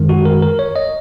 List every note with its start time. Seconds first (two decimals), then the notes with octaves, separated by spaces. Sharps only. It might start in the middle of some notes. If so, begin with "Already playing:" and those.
Already playing: F#2 D#3 G#3
0.09 F#4
0.25 A#4
0.42 A#4
0.59 C#5
0.76 D#5